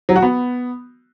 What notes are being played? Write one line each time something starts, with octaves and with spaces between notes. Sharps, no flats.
F#3
F#4
B3